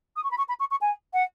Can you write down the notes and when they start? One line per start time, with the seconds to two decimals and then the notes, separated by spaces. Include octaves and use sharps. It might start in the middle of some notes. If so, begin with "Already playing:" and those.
0.16 D#6
0.23 C#6
0.31 B5
0.38 C#6
0.48 B5
0.60 C#6
0.71 C#6
0.81 G#5
1.13 F#5